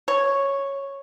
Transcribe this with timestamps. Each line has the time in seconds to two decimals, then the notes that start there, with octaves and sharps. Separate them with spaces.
0.08 C#5